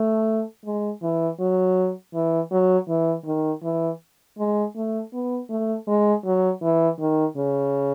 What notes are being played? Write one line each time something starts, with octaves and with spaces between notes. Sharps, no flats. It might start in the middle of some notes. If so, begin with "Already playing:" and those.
Already playing: A3
G#3
E3
F#3
E3
F#3
E3
D#3
E3
G#3
A3
B3
A3
G#3
F#3
E3
D#3
C#3